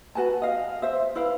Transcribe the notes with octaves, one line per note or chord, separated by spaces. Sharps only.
F#4 B4 G#5 A5
D#5 F5
C5 E5
E4 B4 F5